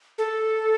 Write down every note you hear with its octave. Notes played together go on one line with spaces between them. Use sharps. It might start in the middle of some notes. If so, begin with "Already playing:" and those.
A4